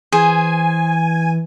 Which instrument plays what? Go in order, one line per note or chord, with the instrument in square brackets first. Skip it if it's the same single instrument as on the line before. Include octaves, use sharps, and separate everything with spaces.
[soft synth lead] E3 [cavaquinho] G#4 C5 [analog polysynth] G#5